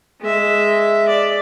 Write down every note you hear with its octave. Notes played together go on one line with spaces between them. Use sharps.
G#3 E5
D5